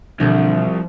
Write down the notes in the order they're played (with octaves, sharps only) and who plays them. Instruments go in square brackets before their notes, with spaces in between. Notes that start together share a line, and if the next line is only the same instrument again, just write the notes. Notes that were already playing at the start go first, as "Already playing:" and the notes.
[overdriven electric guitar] C2 [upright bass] B2 E3 [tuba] D3 [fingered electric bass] F3